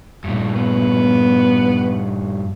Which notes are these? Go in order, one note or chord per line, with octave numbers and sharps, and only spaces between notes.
G2 A#2
B3